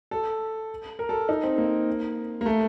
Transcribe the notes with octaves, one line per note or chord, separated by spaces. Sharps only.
A4
A#4
A4
D#4
C4
A#3
A#3
A3